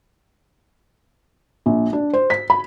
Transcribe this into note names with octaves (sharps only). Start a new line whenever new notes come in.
A#1
D4
C5
B6
B5